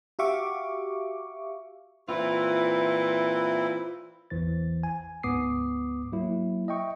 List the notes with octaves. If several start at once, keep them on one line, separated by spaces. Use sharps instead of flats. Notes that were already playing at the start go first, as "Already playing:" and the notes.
F#4 G4 E5 F5 C#6 D6
A#2 E3 C4 E4 F4
G#1 E2 E3 C5 A6
G#5
D2 G#2 B3 D6 D#6 C7
F#3 A#3 E4
D#5 E5 G5 C#6